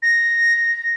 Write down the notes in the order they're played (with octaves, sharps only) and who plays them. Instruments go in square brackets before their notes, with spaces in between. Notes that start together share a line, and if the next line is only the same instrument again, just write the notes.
[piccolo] A#6